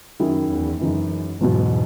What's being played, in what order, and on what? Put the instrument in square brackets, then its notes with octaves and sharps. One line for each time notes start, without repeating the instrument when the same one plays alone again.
[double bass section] F#2 [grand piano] D#3 F#3 C#4 E4 G#4
[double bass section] E2
[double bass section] F#2 [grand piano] C#3 E3 G#3 D#4
[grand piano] E1 E2 B2 F#3 [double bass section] G#2